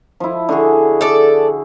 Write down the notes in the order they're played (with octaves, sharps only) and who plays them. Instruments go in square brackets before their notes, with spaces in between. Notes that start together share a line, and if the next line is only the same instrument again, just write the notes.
[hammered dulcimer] F3 E4
D3 F#4 G#4
[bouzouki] A4 D5